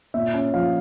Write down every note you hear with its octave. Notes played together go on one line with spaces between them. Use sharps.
A#2 E5
C#4
F3 F5